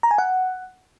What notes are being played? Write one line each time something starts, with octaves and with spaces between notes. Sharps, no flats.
A#5
G#5
F#5